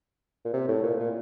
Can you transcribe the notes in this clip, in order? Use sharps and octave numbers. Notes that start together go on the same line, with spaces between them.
A#2
C3
A2
A#2
A#2